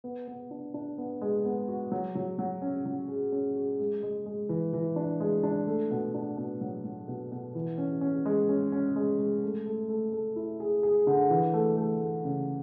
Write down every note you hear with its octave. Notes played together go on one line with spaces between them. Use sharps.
B3
B3
D4
D4
B3
G#3
B3
F#4
F#3
F#3
F#3
C#4
F#3
G#4
C#4
G#4
G#3
G#3
G#3
E3
E3
D4
G#3
D4
A3
B2
D4
B2
F#3
F#3
B2
B2
E3
C#4
C#4
G#3
C#4
C#4
G#3
G#3
A3
A3
A3
A3
E4
G#4
G#4
D3
E3
A3
A3
A3
C#3